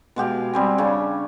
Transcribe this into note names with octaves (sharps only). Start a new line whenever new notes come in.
B2 G#3 G4 F5
G3 C4 G#5
C#3 C#4 D4